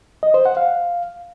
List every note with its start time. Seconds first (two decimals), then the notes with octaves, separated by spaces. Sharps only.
0.23 D#5
0.34 C5
0.46 F#5
0.57 F5